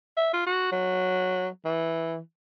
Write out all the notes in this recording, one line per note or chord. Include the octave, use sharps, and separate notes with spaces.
E5
F4
F#4
F#3
E3